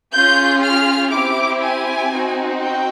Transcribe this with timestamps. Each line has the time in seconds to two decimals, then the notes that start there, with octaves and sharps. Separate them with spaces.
0.12 C#4 F4 G#4 G6
0.61 F6
1.11 C4 E4 G4 D6
1.60 G#5
2.10 C4 D#4 F#4
2.60 G5